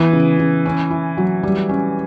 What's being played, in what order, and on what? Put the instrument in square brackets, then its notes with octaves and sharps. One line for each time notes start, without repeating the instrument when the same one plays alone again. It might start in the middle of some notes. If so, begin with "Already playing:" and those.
Already playing: [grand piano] E3 [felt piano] B3
[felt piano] C#3
C#3
C#4
E4
F#3
G3
C#4